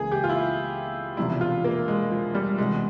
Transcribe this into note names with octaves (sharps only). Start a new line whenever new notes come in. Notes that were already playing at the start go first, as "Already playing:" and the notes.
Already playing: C#2 C#3 E3 A#3 G#4
G4
F4
E4
E1 E2 C3 F3 E4
F4
A#3
G#3
F3
G3
E1 E2 C3 G#3